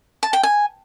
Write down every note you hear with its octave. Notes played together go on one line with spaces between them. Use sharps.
A5
G5
G#5